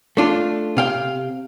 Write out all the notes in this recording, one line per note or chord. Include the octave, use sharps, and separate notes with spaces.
A3 D4 F4
C3 F5 G5